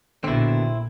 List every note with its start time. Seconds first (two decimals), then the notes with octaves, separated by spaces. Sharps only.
0.24 A#1 B2 D3 C4 E4